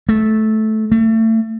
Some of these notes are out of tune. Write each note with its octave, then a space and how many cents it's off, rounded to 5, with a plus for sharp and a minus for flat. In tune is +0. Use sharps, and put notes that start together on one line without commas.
A3 -15
A3 +30